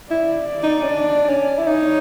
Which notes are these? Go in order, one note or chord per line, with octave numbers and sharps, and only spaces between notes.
E4 D5
D#4
C#4
D4
C#4
E4
D#4 C#5